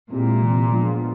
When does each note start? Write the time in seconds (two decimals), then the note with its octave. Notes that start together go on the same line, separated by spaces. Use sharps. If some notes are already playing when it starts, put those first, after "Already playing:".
0.10 A#2 G#3 C4 E4 G4
0.41 C3 E3 G#3
0.71 F3 G#3 B3 D4 F4